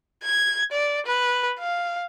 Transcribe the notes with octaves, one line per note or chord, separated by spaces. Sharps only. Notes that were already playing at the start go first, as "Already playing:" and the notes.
G#6
D5
B4
F5